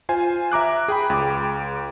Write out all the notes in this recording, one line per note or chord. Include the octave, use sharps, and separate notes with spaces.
F4 C5 G#5
E5 A#5 D6 F#6
G#4 G5 B5
C#2 D6